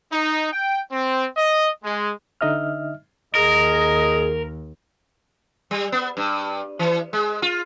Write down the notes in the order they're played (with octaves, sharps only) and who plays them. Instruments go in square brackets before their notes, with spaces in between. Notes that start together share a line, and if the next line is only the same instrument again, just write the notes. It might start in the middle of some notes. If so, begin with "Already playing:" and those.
[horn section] D#4
G5
C4
D#5
G#3
[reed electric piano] D3 D#4 D#5 E5 F6
[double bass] D#2 [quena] G#4 [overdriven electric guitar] A#4 [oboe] D#5
[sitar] G3
B3
G2
E3
G#3
F4